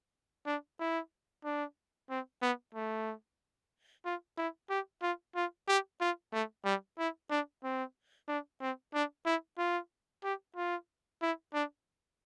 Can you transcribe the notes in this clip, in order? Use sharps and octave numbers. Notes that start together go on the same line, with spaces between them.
D4
E4
D4
C4
B3
A3
F4
E4
G4
F4
F4
G4
F4
A3
G3
E4
D4
C4
D4
C4
D4
E4
F4
G4
F4
E4
D4